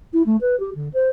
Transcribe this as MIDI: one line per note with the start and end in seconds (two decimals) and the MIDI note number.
0.13 0.22 64
0.26 0.36 57
0.41 0.58 71
0.60 0.70 67
0.75 0.89 50
0.93 1.09 72